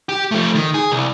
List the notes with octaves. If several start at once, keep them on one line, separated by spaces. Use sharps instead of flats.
G4
F3 A3
D#3
G#4
C2